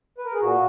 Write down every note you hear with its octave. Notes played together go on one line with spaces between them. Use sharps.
B4
A#4
G#4
A#2 F#4